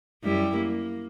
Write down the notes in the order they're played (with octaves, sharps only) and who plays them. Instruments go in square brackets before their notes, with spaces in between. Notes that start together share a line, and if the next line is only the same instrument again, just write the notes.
[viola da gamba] F#2 G3 E4
A#3